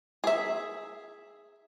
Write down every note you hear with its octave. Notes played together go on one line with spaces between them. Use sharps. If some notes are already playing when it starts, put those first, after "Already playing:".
G#4 E5